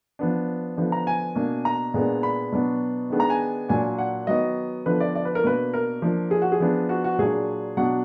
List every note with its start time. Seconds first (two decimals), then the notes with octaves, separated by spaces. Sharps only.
0.19 F3 B3 D4
0.77 D3 F3 B3 D4
0.92 A#5
1.07 G#5
1.35 B2 A#3 D4
1.65 A#5
1.94 A#2 G#3 B3 D4
2.23 B5
2.52 B2 F#3 B3 D4
3.10 D#3 G#3 B3 D4
3.20 A#5
3.30 G#5
3.69 A#2 F#3 A#3 D4 G#5
3.98 F#5
4.27 D#3 F#3 B3 D#5
4.86 D3 F3 B3 D4 B4
5.00 D5
5.15 D5
5.25 B4
5.35 A#4
5.44 B2 A#3 D4 B4
5.74 A#4
6.02 F3 A#3 D4
6.31 G#4
6.42 F#4
6.52 G#4
6.60 F3 B3 D4
6.89 F#4
7.04 F#4
7.18 A#2 F#3 D4 G#4
7.77 B2 F#3 D4 F#5